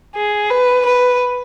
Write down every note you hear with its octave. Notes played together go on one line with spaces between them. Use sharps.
G#4
B4
B4